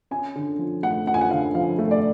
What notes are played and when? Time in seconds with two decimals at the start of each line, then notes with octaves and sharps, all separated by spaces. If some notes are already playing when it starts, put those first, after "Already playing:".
0.11 C#4 G#5
0.36 D3
0.59 F3
0.83 A3 F#5
1.07 C#4 F#5
1.14 G#5
1.21 F#5
1.31 D3 F5
1.55 F3 F5
1.79 A3
1.91 D5